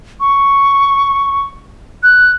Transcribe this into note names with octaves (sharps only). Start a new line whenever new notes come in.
C#6
F#6